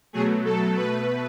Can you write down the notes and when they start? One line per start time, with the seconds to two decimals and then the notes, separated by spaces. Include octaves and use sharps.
0.13 B2 F#3 A3 G#4
0.45 A4
0.76 B2 A3 B4